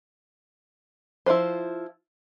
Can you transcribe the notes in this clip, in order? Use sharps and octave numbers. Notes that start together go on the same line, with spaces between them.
F3 E4 F4 B4 C5